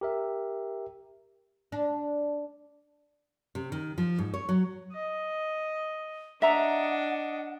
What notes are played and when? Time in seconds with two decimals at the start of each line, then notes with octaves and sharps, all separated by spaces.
0.01 G4 A#4 E5
1.72 D4
3.55 C3
3.72 D#3
3.98 F3
4.19 G#2
4.34 C#5
4.49 F#3
4.92 D#5
6.42 D4 D#5 E5 F#5 A#5